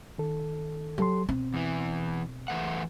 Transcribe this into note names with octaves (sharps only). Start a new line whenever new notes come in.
D#3 A4
F#3 G4 A4 C6
B2 C4
E2 E3
E3 A3 F#5